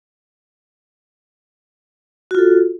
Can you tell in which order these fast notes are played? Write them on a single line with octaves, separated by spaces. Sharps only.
F#4 F4 A4